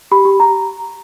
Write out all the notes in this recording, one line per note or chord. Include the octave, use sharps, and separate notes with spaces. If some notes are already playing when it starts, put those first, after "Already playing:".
G4 B5
G4
G4 A#5